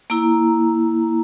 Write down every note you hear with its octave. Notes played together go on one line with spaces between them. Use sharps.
A#3 E4 A#5